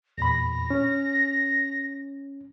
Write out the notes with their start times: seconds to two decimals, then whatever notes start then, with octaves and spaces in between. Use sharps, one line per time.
0.18 E2 A#2 B5 A#6
0.70 C#4